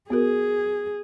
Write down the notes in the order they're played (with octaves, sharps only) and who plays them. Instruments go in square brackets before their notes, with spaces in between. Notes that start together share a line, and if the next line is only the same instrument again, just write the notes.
[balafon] B3 F#4 A#4 [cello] G#4